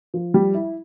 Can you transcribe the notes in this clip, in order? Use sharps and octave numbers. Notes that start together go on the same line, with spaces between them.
F3
G3
E4